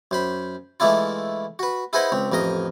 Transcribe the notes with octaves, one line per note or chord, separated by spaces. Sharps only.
F#2 C5 B5
E3 G#3 A3 D4 E4 F4
F#4 B4
E4 G#4 B4 C5 D#5 F#5
C#2 C4
A1 F2 A#4 D#5 D#6